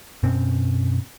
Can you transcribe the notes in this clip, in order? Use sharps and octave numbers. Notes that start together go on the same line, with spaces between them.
F#2 B2 C4 C#4